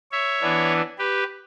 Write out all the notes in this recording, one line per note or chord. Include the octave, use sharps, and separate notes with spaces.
C#5 E5
E3 B3 D4
G4 B4